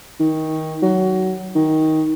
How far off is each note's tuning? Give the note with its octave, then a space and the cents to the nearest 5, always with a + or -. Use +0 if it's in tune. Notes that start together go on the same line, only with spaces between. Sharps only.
D#3 +20
F#3 +20
D#3 +15